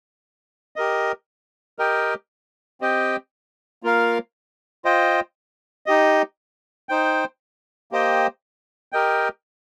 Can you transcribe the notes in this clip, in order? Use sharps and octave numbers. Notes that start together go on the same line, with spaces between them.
G4 A#4 D#5
G4 A#4 D#5 G5
C4 G4 D#5 G5
A#3 F4 A#4 F5
F4 C5 D#5 G5
D#4 G4 D#5
D#4 C5 G5
A#3 G4 C5 D#5 G5
G4 A#4 D#5 G5